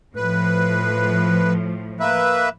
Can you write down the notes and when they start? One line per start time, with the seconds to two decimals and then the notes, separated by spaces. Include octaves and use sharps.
0.16 A2 F3 B4
2.00 A#3 B4 E5